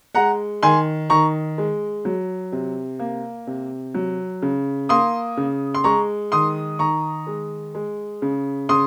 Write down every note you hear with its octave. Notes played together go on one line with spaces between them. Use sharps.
G#3 F#5 A#5
D#3 G#5 C6
D#3 A#5 C#6
G#3
F#3
C3
A#3
C3
F#3
C#3
A#3 C6 D#6
C#3
C6
G#3 A#5 C#6
D#3 C6 D#6
D#3 A#5 C#6
G#3
G#3
C#3
C#3 C6 D#6